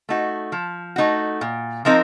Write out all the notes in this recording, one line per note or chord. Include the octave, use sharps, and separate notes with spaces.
A3 D#4 F#4
F3
A3 D#4 F#4
A#2
F3 C4 D#4 A#4